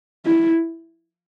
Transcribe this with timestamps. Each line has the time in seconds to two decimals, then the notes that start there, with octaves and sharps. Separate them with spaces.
0.25 E4